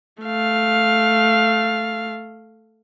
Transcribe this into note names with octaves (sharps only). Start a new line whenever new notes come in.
A3 F5